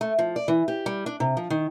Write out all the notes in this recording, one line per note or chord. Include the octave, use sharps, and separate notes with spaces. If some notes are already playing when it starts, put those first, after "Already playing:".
A3
F3
D5
E3
G4
G3
D4
C3
F3
D#3